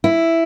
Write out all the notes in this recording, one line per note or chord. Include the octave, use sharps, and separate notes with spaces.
E4